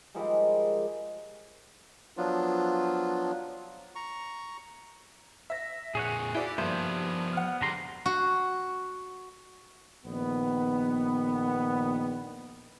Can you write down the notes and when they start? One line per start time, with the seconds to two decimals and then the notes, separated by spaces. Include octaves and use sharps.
0.15 D#3 F3 G3 G#3
2.17 F3 F#3 B3 D4 F4
3.95 A#5 C#6
5.50 E5 A#6
5.95 F2 A#2 G#4 C#5 F#5
6.35 E4 F#4 G4 D5
6.58 G2 F3 A#3 B3 C5 E5
7.33 F#5 F6
7.62 D3 G3 A3 A#5 C6
8.06 F#4
10.05 A#1 D#3 B3